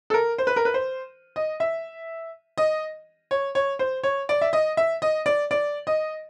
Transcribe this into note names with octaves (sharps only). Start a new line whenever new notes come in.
A4
A#4
C5
B4
A#4
B4
C5
D#5
E5
D#5
C#5
C#5
C5
C#5
D5
E5
D#5
E5
D#5
D5
D5
D#5